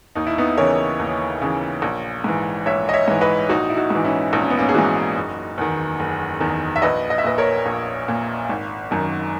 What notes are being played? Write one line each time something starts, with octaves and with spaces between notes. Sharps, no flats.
D#2 D#4
E4
B3 D#4
C#3 E3 A#4 C#5
D#2
C#3 E3
A#1
G#2 E3
A#1 C#5 E5
D#5
C#5 E5
G#2 E3
B4 D#5
A#1 D#4 F#4
E4
D#4 F#4
G#2 E3
C#4 E4
A#1 D#4
C#4
B3
A#3 C#4
G#4
G#2 E3 D#4 F#4
F#1
E2 D#3
F#1
E2 D#3
E5
A#1 B4 D#5
D#5
E5
A#2 B4 D#5
A#4 C#5
A#1
A#2
G#1
F#2 D#3